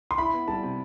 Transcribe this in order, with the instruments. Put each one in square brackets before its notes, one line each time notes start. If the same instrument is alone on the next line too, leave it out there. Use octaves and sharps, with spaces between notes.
[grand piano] C6
[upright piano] E4 [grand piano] B5
[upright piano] B3
[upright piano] G3 [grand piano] A5
[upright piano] C3